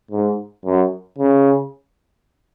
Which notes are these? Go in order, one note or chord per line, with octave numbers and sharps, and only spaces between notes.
G#2
F#2
C#3